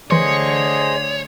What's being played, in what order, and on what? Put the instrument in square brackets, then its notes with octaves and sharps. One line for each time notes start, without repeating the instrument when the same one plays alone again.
[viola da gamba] D3 A3 [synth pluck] E3 C6 [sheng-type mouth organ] G#4 C5 D#5 [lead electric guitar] C#5